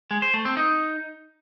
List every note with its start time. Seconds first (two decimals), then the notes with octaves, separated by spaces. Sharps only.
0.11 G#3
0.22 C5
0.34 A3
0.45 C4
0.57 D#4